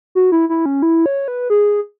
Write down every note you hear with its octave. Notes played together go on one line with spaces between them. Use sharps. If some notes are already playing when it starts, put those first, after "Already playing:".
F#4
E4
E4
C#4
E4
C#5
B4
G#4